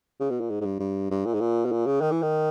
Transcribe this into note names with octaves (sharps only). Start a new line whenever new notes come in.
C#3
B2
A#2
G#2
G#2
G2
G2
G2
A#2
G#2
A#2
B2
A#2
C#3
D#3
E3
D#3